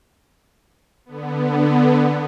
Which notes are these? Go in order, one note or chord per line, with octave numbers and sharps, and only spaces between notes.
D3 B3